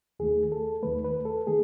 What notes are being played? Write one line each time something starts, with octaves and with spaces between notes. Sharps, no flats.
D#2 D#3 A3 G#4
A4
D#2 D#3 A3 B4
B4
A4
D#3 A3 G#4